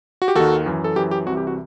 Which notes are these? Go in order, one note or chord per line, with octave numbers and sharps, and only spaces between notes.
F#4
G4
D#2 D#3 F#4 A4
F#2 E3
A4
F#2 E3 G4
G4
C2 C3 E3 F#4
G4
F#4